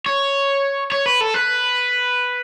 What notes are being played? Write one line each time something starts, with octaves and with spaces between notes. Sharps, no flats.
C#5
C#5
B4
A4
B4